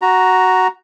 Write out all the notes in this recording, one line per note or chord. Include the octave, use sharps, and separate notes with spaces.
F#4 A#5